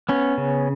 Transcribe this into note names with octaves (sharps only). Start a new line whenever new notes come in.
B3 C#4
C#3